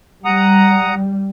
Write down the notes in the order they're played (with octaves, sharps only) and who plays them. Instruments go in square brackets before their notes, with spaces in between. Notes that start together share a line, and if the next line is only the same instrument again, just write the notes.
[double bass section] G3 [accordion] F#5 A#5 D#6